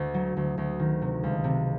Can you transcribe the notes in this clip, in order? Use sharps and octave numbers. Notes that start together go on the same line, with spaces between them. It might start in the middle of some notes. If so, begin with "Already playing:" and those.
Already playing: D2
F#3
D2
D2
D#3
C3
C#2
C3